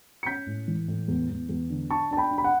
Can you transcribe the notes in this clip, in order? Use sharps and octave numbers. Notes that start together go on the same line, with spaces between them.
C#7
C#4 G6 B6
A2
E3
A2
E2
E2
E2
D3
D4 A5 C#6
D4 A5
G5 B5
D4
B5
F#5